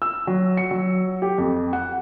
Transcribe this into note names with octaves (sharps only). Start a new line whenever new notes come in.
E6
F#3
C#7
F#3
G4
F2
F#5